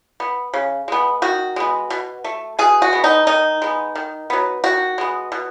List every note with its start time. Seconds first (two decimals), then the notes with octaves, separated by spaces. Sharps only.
0.20 B3
0.53 C#3
0.88 G#3 B3
1.22 D#3 F#4
1.56 G#3 B3
1.90 B2
2.24 A3
2.59 B2 G#4
2.82 F#4
2.93 G#3 B3
3.04 D#4
3.27 D#3 D#4
3.62 G#3 B3
3.95 D#3
4.30 F#3 B3
4.64 D#3 F#4
4.98 G#3 B3
5.32 B2